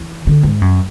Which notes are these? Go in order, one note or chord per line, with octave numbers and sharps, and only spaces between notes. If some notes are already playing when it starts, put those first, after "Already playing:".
Already playing: E3
D3
G#2
F#2